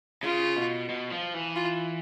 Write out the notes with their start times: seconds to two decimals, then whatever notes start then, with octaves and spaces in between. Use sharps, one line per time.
0.23 C#3 F4
0.56 B2
0.89 B2
1.11 F3
1.34 E3
1.56 F4